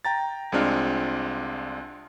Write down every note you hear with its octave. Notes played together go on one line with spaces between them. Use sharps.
G5 A#5 A6
C2 G#3 C4 D4 F4 F6